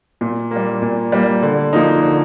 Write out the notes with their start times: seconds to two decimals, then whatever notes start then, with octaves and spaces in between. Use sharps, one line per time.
0.21 A#2
0.51 G3 A#3
0.82 A#2
1.12 G3 A#3
1.43 D3
1.73 F3 A#3 D#4
2.03 D3